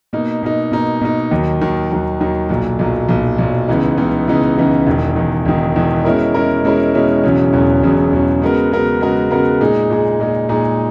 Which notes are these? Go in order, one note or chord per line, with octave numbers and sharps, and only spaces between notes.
B2 A#3 D#4
B2 A#3 D#4
B2 A#3 D#4
B2 A#3 D#4
D#2 D#3 F#3
D#2 D#3 F#3
D#2 D#3 F#3
D#2 D#3 F#3
B1 A#2 F#3
B1 A#2 F#3
B1 A#2 F#3
B1 A#2 F#3
C#2 C#3 E3 B3 D#4
C#2 C#3 E3 B3 D#4
C#2 C#3 E3 B3 D#4
C#2 C#3 E3 B3 D#4
E1 E2 D#3
E1 E2 D#3
E1 E2 D#3
E1 E2 D#3
B2 G#3 C#4 E4 A#4
B2 G#3 C#4 E4 A#4
B2 G#3 C#4 E4 A#4
B2 G#3 C#4 E4 A#4
E1 E2 C#3 F#3 C#4
E1 E2 C#3 F#3 C#4
E1 E2 C#3 F#3 C#4
E1 E2 C#3 F#3 C#4
C#3 G#3 B3 F#4 A#4
C#3 G#3 B3 F#4 A#4
C#3 G#3 B3 F#4 A#4
C#3 G#3 B3 F#4 A#4
A#2 G#3 D#4 G#4
A#2 G#3 D#4 G#4
A#2 G#3 D#4 G#4
A#2 G#3 D#4 G#4